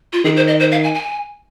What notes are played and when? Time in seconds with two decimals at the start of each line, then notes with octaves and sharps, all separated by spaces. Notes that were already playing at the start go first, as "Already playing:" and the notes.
0.13 F4
0.24 D#3 G#4
0.36 C5
0.47 D#5
0.60 C5
0.72 F5
0.84 G#5
0.94 G#5